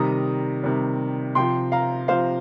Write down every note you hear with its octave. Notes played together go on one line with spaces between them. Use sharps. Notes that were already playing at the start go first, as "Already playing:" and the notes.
Already playing: C3 D#3 G3 A#5 D#6
C3 D#3 G3
C3 F3 G5 C6
F5 A#5
C3 F3 C5 F5